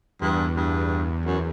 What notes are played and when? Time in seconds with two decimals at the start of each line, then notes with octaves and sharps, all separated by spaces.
0.21 E2 G2
0.56 G2
1.26 F#2